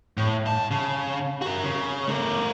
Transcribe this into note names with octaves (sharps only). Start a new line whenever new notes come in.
A2
G2 A5
C#3
F#4 A#4
C#3
A3 A#4